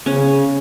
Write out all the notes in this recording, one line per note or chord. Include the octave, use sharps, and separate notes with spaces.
C#3 C#4